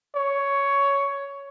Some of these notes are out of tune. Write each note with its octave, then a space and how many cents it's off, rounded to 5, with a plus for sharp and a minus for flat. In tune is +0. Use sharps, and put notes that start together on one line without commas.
C#5 +10